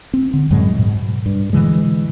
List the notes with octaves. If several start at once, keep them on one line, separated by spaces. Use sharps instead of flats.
C4
D3
F#2 A2 F#3 G#3
G#2 B2
G2
B2 D3 E3 G#3